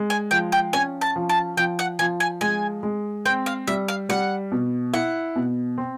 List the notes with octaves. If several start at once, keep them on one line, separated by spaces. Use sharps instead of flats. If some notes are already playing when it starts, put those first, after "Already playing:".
Already playing: G#3
G#5
F3 G5
G5
C#4 G#5
A5
F3
A5
F3 G5
F#5
F3 G#5
G#5
G#3 G#5
G#3
C4 G5
F5
G3 E5
F5
G3 F#5
B2
E4 F#5
B2
C4